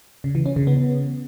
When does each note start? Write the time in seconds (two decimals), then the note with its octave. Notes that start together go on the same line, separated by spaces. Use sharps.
0.24 C#3
0.35 E3
0.46 C#4
0.56 C#3
0.67 B3